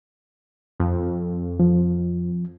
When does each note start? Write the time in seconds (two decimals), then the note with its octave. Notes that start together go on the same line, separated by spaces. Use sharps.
0.80 F2
1.60 F3